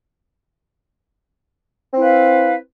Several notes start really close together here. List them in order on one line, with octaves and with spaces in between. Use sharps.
C4 E4 B4 F5